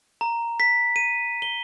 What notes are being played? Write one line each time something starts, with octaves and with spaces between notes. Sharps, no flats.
A#5
B6
D#7
G7